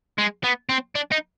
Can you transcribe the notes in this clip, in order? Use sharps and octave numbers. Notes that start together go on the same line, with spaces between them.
G#3
B3
C4
D4
D#4